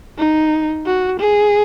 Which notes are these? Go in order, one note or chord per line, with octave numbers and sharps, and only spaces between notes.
D#4
F#4
G#4